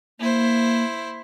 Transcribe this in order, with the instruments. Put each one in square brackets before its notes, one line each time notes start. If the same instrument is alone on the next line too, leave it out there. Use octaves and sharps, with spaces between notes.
[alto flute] A#3 [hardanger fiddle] E4 C5